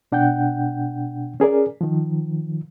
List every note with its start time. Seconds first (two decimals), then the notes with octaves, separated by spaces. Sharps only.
0.12 B2 D4 F#5 G5 G6
1.40 C#4 G#4 A#4 D5
1.81 D#3 F3